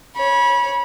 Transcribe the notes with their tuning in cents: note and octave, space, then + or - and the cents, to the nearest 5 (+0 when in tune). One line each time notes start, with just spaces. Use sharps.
C#5 +0 B5 -30